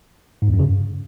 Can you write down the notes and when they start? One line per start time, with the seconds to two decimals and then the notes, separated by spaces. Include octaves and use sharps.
0.42 G#2
0.48 E2
0.54 F#2
0.59 C#3
0.65 G2